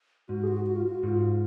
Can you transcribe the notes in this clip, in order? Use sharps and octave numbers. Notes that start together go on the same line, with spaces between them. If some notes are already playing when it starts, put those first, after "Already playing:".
G#2 F#4
G#4
F#4
F#4
F4
F#4
G#2 F4